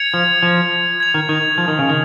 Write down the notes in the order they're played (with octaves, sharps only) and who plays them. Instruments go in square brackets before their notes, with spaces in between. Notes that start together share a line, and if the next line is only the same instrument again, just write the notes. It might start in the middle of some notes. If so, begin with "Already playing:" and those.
Already playing: [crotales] G#6 C#7 F7
[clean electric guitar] F3
F3
[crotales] G#6 F7
[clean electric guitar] D#3
D#3
F3
D#3
C#3
D#3